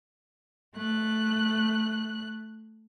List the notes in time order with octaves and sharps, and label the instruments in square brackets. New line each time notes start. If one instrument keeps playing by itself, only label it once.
[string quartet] A3 F#6